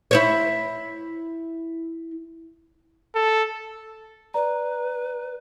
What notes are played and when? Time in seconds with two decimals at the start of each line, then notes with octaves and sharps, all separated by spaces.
0.11 E4 C5 C#5
3.15 A4
4.34 B4 D5 A#5